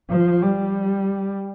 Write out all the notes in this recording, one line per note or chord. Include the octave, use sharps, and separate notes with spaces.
F3
G3